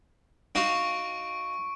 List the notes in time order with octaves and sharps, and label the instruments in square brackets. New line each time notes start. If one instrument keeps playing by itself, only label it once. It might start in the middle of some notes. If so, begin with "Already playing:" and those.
[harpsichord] D#4 F#4 F5 [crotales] C#6 D7